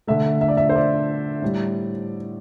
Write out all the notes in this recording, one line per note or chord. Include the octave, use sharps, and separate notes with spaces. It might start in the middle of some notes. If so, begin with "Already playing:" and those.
D3 A3 E5
E5
D5
E5
C5
D5
A2 G3